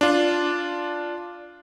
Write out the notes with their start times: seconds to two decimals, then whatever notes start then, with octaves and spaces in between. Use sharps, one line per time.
0.01 D4 F4